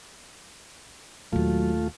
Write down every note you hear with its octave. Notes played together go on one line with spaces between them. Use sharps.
D#2 A#2 F#3 A3 F4